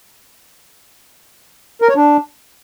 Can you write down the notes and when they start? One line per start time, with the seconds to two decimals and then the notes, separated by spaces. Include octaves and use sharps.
1.82 A#4
1.89 C#5
1.96 D4